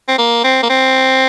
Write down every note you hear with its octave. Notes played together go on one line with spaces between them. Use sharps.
C4
A#3
C4
A#3
C4